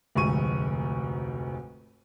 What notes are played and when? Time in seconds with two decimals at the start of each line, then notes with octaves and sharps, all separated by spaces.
0.15 F1 D2 G#2 C#6 D#7